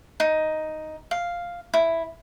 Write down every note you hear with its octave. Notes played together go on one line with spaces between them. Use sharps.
D#4
F5
E4